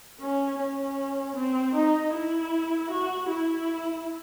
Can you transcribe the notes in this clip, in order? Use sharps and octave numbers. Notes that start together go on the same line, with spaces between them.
C#4
C#4
C4
D#4
E4
F#4
E4